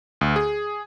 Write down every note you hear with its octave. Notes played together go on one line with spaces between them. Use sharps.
D2
G#4